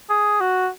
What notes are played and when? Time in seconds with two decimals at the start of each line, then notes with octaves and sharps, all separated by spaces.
0.10 G#4
0.41 F#4